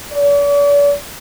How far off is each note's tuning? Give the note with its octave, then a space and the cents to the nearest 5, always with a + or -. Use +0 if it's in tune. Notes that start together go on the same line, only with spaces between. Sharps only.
D5 -45